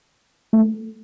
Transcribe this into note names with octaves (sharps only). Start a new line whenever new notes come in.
A3